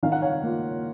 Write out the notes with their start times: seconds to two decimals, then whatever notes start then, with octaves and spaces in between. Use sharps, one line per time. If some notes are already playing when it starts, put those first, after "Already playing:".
0.03 D#3 F5
0.12 F#5
0.22 C#5 F5
0.43 A#3 F4